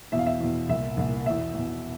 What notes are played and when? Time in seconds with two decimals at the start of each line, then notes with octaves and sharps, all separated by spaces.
0.12 E2 B2 E5
0.19 F5
0.26 E5
0.40 E2 B2
0.69 C2 A#2 E5
0.97 C2 A#2
1.26 E2 B2 E5
1.54 E2 B2